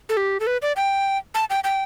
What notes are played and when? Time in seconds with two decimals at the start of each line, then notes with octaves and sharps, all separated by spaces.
0.09 A4
0.17 G4
0.40 A4
0.47 B4
0.62 D5
0.76 G5
1.35 A5
1.50 G5
1.64 G5